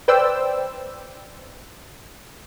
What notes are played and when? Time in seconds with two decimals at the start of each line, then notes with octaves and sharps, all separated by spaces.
0.08 B4 C5 D5 G5 E6